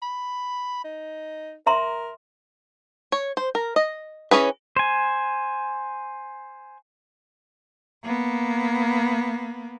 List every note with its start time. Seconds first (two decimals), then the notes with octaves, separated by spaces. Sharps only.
0.02 B5
0.84 D#4
1.67 A#4 E5 A#5 C6
3.12 C#5
3.37 C5
3.55 A#4
3.76 D#5
4.31 E3 C#4 G#4 B4
4.76 C5 G#5
8.04 A#3 B3